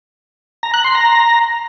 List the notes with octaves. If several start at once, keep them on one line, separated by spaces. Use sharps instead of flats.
A#5
F#6
C6
A#5